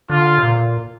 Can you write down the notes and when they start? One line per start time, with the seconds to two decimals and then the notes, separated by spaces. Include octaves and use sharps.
0.10 D3 F4
0.38 C3
0.42 A#2